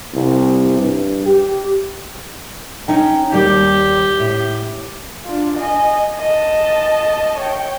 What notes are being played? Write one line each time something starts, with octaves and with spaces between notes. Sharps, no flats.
C2
G2
G4
C#4 D#4 G5
D#2 G3 G4
A2
D4 F4
D#5 G#5
D#5 A5
C#5 G5